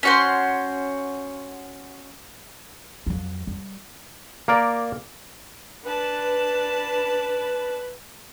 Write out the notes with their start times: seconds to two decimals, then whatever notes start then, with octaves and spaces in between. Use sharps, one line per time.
0.03 C#4 F#4 C5
3.07 F2 F#3
3.47 G3
4.48 A#3 A#4 D5
5.85 D4 B4 A5